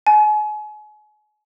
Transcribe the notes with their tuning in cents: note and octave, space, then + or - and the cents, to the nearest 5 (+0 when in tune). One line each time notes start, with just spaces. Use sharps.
G#5 +35